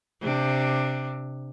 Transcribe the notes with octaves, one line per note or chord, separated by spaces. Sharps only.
C3 D4